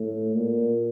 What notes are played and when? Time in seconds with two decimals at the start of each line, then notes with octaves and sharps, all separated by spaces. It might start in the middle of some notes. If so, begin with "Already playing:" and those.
Already playing: A2
0.35 A#2